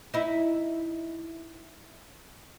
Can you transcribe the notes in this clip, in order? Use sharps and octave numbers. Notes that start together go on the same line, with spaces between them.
D#4 E4